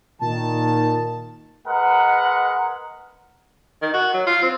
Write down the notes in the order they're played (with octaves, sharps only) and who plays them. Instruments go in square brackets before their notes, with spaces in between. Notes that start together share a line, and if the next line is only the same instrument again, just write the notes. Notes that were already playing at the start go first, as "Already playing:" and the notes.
[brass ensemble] A#2 D#3 [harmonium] A5
[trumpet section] G#3 A#4 B4 F#5
[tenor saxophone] D#3
F#4
F#3
F4
C4